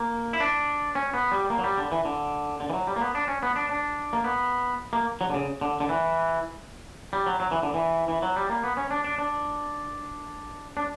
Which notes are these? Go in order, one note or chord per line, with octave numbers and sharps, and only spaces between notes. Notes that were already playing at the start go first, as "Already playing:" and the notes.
Already playing: A#3
E4
D4
C#4
B3
G3
A#3
F#3
G3
D3
E3
D3
D3
E3
F#3
G3
A#3
B3
D4
C#4
B3
D4
D4
A#3
B3
A#3
F#3
D3
C#3
D3
D3
E3
G3
F#3
F#3
E3
D3
E3
E3
F#3
G3
A#3
B3
C#4
D4
D4
D4
D4